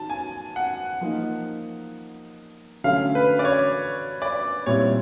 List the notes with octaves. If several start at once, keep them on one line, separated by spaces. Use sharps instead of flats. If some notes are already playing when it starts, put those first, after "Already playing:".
Already playing: D#3 F#3 A5
G#5
F#5
F3 A#3 D#4
D3 F#3 A3 C#4 F5
B4
D5
C#5
D5
A#2 G3 C4 E4 C#5